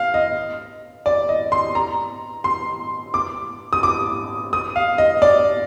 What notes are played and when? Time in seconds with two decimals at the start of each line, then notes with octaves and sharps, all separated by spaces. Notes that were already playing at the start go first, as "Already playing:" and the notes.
Already playing: F5
0.14 D#5
1.06 D5
1.29 D#5
1.52 C6
1.75 A#5
2.44 C6
3.14 D6
3.73 D#6
3.83 D6
4.53 D#6
4.76 F5
4.98 D#5
5.22 D5